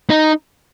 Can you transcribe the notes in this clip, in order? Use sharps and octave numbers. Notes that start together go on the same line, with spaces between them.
D#4